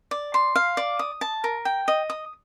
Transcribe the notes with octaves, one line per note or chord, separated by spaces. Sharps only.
D5
C6
F5
D5
D#6
A5
A#4
G5
D#5
D#6